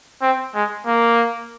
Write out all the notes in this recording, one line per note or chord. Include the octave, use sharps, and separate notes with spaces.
C4
G#3
A#3